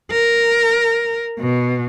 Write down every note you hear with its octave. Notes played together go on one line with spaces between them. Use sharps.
A#4
B2